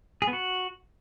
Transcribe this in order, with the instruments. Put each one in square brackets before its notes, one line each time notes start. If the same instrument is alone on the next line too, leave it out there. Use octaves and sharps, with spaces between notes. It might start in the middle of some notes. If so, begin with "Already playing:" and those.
[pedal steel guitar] G#4
B3
F#4